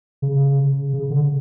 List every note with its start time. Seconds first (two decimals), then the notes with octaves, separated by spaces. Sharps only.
0.22 C#3
0.93 C#3
1.10 D3